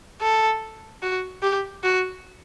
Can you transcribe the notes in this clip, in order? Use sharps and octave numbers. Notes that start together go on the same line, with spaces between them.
A4
F#4
G4
F#4